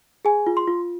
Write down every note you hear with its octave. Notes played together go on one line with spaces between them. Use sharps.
G#4 G#5
F4
C6
F4